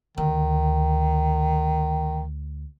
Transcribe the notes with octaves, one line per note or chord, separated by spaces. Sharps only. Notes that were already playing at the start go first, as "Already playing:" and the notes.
D2 D#3